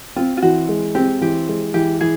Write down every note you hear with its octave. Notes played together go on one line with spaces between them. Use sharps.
C4 F4
F4
E3 F#4
G#3
C4 G4
E3 G4
G#3
E3 G4
E3 G#4